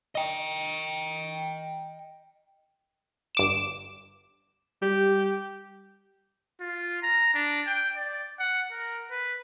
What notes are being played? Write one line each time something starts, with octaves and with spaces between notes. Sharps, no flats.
D#5 G5
G1 D6 E7
G3 G4
F4
A#5
D4
G5
D5
F#5
A#4
B4